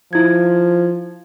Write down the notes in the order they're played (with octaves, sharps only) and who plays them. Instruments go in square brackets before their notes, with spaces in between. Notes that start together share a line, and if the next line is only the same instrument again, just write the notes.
[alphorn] F3 [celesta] E4 G#6